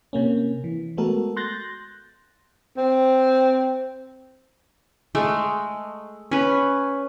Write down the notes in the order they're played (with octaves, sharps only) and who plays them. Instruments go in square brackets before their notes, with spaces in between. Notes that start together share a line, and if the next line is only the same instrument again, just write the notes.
[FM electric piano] C3 A#3 C#4
E3
G#3 A3 B3 F#4 A4 A#4
C6 F#6 G6 A6 A#6
[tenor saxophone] C4
[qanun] G#3 A3
C#4 B4